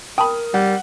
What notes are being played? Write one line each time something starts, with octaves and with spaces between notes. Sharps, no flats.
A#4 G5 A5 B5 D#6
G3 F#5